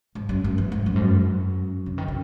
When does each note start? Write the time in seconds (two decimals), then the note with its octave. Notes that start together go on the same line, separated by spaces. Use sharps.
0.15 G#2
0.29 F#2
0.44 F#2
0.58 E2
0.72 G#2
0.86 F#2
0.96 G#2
1.00 F#2
1.86 C#3
1.98 D#3
2.08 C#3